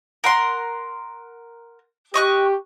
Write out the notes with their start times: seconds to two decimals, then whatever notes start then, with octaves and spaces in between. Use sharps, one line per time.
0.24 A#4 F#5 C6
2.14 G4 D#5 C#6 F#6